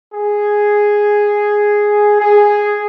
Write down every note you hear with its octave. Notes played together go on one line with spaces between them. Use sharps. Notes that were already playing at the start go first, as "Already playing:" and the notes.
G#4
G#4